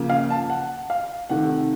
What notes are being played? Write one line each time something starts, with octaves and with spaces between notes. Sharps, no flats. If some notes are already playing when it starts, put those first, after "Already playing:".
Already playing: C#3 F3 A#3
F5
A5
F#5
F5
C3 D#3 A3 F#5